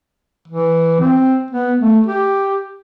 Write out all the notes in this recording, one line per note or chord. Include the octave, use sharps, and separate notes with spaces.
E3
C4
B3
A3
G4